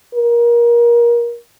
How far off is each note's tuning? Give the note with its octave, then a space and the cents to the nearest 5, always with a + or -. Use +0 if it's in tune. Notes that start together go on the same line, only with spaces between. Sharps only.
A#4 +25